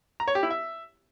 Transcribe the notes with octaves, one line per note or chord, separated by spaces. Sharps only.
A#5
C#5
G4
E4
E5